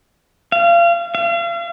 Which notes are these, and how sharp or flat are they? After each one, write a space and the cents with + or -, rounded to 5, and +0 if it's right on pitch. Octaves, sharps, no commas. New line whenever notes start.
F5 -30
F5 -40